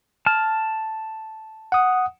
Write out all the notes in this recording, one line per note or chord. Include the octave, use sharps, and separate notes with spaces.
A5 F6
F#5 D#6